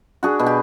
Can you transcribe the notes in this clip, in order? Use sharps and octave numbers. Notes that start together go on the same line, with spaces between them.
D4 F#4 G#4
B2
G4